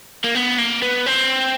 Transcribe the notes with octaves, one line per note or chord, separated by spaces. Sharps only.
A#3
B3
A#3
B3
C4